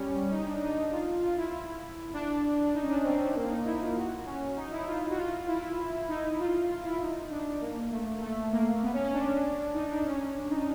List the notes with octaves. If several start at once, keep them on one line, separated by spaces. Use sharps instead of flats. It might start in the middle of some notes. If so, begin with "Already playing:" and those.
Already playing: G3 C#4
D#4
D4
D#4
F4
F4
E4
E4
D4
D#4
C#4
D4
C4
A#3
D#4
E4
F4
F#4
C#4
D#4
E4
F4
F#4
F4
E4
D#4
F4
F4
E4
D#4
D4
A#3
A3
A3
A#3
B3
C#4
C#4
D4
D#4
D4
C#4
C#4
D4
D#4